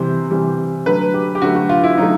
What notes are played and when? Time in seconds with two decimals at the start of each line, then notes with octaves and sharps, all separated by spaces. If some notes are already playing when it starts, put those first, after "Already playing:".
Already playing: C3 E3 G3 C5
0.31 C3 E3 G3
0.86 D3 F#3 A3 B4
1.14 G4
1.35 G4
1.42 D3 F#3 A3 F#4
1.56 F#4
1.69 F4
1.84 E4
1.97 D3 F#3 A3 D#4